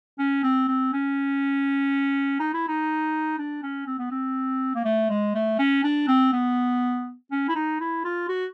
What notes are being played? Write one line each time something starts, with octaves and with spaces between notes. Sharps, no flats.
C#4
C4
C4
C#4
D#4
E4
D#4
D4
C#4
C4
B3
C4
A#3
A3
G#3
A3
C#4
D4
C4
B3
C#4
E4
D#4
E4
F4
F#4